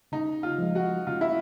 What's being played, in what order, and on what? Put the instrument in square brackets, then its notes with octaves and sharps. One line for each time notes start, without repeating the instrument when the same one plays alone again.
[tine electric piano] C#3 [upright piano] D#4
[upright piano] F4
[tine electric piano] F3 G#3
[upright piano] F#4
[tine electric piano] C#3 [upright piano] F4
[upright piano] E4